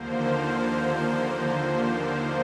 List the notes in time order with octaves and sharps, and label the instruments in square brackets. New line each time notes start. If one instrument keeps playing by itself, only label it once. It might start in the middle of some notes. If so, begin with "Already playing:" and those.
Already playing: [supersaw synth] D#2 D3 F3 A#3 C5